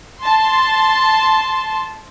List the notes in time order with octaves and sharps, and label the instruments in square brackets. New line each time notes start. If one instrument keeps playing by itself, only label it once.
[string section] A5 C6